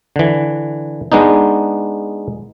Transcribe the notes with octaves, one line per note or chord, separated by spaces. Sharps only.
D3 E3
G#3 B3 D4 D#4